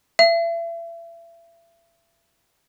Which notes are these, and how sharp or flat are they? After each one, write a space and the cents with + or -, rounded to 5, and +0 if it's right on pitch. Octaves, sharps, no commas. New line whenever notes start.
E5 +35